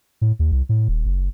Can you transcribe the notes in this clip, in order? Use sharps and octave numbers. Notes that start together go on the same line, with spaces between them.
A2
D#2
C2
A2
D#1
F#1